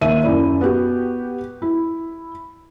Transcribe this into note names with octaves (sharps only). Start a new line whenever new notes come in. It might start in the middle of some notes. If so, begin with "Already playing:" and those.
D#2 E5 D#7
F#2 E4 D5
B3 F#4 G4
E4